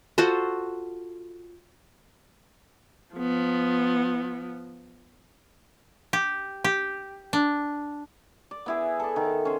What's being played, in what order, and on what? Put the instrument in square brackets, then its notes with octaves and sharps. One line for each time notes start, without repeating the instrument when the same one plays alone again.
[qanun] F4 F#4 A4 C5
[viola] F3 B3
[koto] G4
G4
D4
[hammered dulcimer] D5
B3 E4 G#4
A4 D5
D#3
C#4 C5